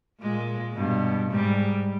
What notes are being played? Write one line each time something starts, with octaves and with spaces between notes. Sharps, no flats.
A#2 G#3
G2 B2
G#2 G3